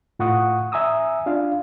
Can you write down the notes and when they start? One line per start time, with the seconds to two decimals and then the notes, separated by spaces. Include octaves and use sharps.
0.19 A2 F4 F#5 C#6 D#6
0.72 E5 G#5 A#5 D#6 E6
1.26 D4 F4 F5